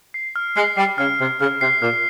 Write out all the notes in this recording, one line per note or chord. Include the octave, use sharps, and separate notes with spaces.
C7
F6
G#3 C7
G3 C7
C#3 F6
C3 F6
C#3 F6
C3 C7
A#2 F6